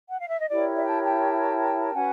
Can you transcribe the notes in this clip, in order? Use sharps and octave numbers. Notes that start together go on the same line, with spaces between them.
F#5
F5
E5
D#5
E4 G4 A#4 C#5 D5
D5 E5
G5 A5
G5 A5
C#4 F#4 B4 F#5 G#5